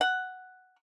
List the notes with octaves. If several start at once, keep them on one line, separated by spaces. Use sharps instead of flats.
F#5